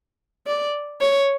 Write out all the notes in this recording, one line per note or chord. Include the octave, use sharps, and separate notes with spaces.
D5
C#5